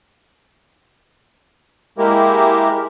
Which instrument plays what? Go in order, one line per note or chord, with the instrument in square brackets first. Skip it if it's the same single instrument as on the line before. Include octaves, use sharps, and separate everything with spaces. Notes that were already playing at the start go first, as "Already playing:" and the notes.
[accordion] G#3 A#3 E4 G4 A#4